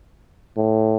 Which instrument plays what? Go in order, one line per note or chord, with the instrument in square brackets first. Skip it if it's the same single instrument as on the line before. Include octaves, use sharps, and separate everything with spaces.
[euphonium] A2